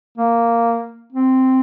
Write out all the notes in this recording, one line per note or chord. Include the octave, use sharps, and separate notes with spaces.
A#3
C4